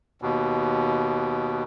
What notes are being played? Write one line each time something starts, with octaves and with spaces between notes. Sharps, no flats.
D#2 B2